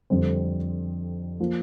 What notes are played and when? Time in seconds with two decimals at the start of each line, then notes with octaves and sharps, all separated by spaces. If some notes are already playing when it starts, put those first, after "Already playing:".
0.10 F2 D3 G3 C4
1.40 F3 A#3